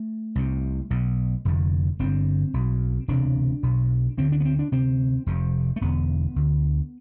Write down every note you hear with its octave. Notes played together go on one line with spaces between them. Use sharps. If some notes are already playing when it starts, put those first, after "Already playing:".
Already playing: A3
C2 C3
B1 B2
F1 F2 D3
G1 G2 D3 C4
B1 B2
E1 D2 C3 D4
B1 B2
D2 D3 C4
D4
B3
C4
D4
D2 C3 C4
F1 F2 C3
A3
E1 E2 D3 B3
D2 D3